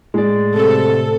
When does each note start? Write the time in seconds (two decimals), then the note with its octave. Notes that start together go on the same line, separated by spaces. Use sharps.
0.14 A2 G#3 D5
0.55 C3 A4